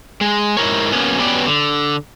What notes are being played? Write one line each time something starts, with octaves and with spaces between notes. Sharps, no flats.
G#3
G#2 E4 A#4 C#5
F#2 A#3 B3 C#4
F#3 B3 C#4 G4 B4 D5
D3